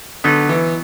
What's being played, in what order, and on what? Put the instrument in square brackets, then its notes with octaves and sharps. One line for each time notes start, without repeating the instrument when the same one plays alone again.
[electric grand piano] D3 [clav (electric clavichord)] F#3 B3 D#4
[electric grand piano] E3